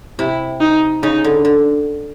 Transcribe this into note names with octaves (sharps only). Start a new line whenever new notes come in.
C3 E4
D#4
C#3 D#4
D3
D3